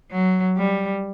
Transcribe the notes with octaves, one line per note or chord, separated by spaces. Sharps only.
F#3
G3